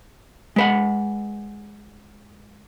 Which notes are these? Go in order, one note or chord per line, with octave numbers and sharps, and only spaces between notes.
G#3 B4 F#5